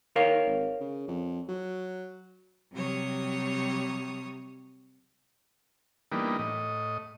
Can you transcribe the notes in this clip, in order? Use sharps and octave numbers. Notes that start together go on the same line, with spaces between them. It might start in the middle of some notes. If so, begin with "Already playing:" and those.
D#3 A#4 C#5 F5
G#1
C#3
F2
F#3
C3 F#3 G3 C#5 D#6
E3 G3 A#3 B3 D4 D#4
A2 D#5